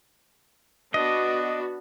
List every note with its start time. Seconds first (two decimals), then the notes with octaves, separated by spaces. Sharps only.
0.94 B3 D4 F#4 D#5